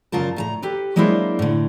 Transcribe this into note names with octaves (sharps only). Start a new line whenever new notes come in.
F#2 C#3 F4 A#4 A5
A2 A5 A#5
G4 A4 B4
F#3 G#3 A#3 D4 E4 C5
A2 D3